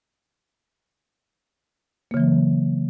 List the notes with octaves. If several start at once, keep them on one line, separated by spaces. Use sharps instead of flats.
C#3 E3 F#3 A#3